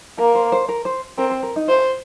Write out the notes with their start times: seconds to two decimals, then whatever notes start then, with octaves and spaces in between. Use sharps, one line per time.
0.18 A#3 A#4
0.35 C5
0.52 C5
0.69 A#4
0.85 C5
1.18 C4 A#4
1.31 C5
1.43 A#4
1.56 D#4
1.68 F4 C5